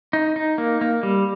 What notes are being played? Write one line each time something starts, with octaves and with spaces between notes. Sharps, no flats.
D#4
D#4
A#3
A#3
G3